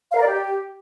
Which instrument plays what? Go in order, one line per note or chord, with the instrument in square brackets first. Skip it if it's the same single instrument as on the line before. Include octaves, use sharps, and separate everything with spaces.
[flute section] F5
A#4
D5
G4